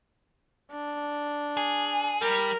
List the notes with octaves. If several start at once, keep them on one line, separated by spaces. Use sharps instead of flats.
D4
G#4
G3 A#4